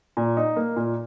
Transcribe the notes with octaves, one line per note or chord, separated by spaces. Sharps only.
A#2
D#4
A#3
A#2